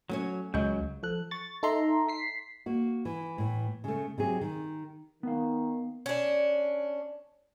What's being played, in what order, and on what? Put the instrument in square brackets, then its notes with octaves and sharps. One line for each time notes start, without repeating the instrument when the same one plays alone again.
[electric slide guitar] F#3 [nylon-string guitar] A3 C#4 C#5
[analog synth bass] C#2 [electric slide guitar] C#3 F#3 [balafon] G#3 D#5
[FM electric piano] F3 A4 F#6
C#6 A6
D#4 A4 E5 A#5 C6
B6 C7
[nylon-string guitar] A#3 F#4
E3
A2 E3
C#3 A3
C3 F#3 G#4
D#3
[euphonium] D#3 [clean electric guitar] B3 F5
[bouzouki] C#4 D4